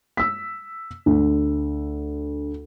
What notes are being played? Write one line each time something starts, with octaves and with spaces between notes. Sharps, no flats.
E6 B6
D2